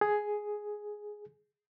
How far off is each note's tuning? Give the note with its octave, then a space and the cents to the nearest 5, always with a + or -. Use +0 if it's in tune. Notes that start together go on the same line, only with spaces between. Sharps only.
G#4 +5